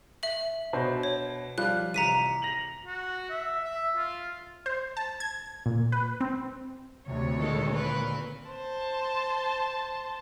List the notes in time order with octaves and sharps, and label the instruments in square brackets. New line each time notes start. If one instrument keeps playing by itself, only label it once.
[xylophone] E5 F#7
[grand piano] B2 D4 C5
[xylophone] C#5
[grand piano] F3 G3 F4 [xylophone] F#6
[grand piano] A1 C3 C#7 [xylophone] A#5 B6 D#7
[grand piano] A#6 F7 F#7
[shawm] F#4
E5
E5
F4
[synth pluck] C5
A5
G#6
A#2
B4
C4
[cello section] D2 C#5 [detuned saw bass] C3
[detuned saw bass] A#2 [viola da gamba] D#3 G#3 A4
[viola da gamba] C4 A#4 B4
[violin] C5 A5